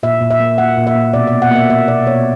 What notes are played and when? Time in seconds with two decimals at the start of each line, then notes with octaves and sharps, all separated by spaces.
0.03 A#2 E5
0.21 A#2
0.31 E5
0.40 A#3
0.58 A#3 F#5
0.77 A#2
0.87 E5
0.95 A#2
1.13 B2 D5
1.27 D5
1.32 B2
1.42 F#5
1.51 A#3 E5
1.69 A#3 E5
1.88 B2 D5
2.06 B2 C#5